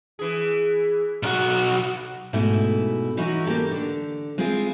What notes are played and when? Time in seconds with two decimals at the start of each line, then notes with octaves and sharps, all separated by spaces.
0.19 E3 G#4
1.23 B1 F#4
2.33 G#2 B2 A3 E4
3.17 E3 C#4 D#4 E4 F#4
3.45 A#3 G4 A4
3.71 D3
4.38 G#3 C4 E4 F4 G#4